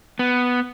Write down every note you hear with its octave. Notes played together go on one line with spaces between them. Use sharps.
B3